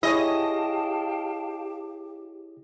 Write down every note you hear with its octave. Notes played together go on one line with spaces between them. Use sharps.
E4 G4 G#4 C#5 D#5 F5 G5 A5